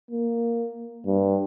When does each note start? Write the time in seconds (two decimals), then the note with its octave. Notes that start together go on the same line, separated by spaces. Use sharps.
0.11 A#3
1.06 G2